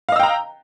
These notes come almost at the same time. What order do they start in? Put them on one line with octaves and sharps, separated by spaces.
F5 D#5 E6 G5 A#5